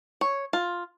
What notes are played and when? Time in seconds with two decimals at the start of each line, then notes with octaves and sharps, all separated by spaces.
0.21 C#5
0.53 F4